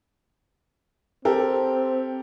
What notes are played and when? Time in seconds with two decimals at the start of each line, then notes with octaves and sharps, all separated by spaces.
1.25 C4 G4 A4 A#4